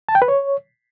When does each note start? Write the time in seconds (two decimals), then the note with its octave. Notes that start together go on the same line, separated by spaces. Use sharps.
0.09 A5
0.15 G5
0.22 B4
0.28 C#5